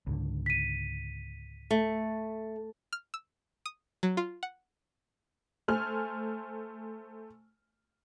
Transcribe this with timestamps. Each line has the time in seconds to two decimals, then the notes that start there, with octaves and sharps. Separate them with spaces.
0.07 C#2 G#2 D3
0.46 B6 D#7
1.71 A3
2.93 F6
3.14 E6
3.66 D#6
4.03 F#3
4.17 F4
4.43 F#5
5.68 A3 C5 G#5 F6